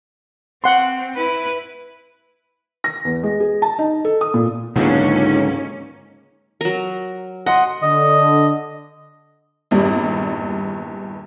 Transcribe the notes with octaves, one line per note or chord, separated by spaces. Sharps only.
C4 F#5 C6
E4 B4
A#6
E2
G#3
G#4
A5
D#4
A4
D#6
A#2
C#2 G#2 D3 F3 F#3 A#3 C#4 D#4
F#3 A#4
D#5 F#5 C6
D3 D#5
G#1 E2 G2 A#2 G3